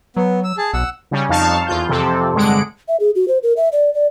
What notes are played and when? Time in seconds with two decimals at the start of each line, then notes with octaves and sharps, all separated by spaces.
0.17 F#3 B3
0.44 E6
0.58 G#4 A5
0.74 B1 F#5 E6
1.11 C#3 G3 C#4
1.29 F2 D#4 F5 A5 C#6 F6
1.67 E2 F4 G6
1.88 F2 C3 C4 A4
2.34 G2 D3 G#3 F#5 D7
2.88 E5
3.00 G#4
3.15 F#4
3.28 C5
3.43 A#4
3.57 E5
3.72 D5
3.94 D5